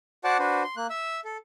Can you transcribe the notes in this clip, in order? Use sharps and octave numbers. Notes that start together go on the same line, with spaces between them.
F#4 C5 D5 F#5 A5 D6
D4 F#4 B4 C5
C6
A#3 F#6
E5 E6
A4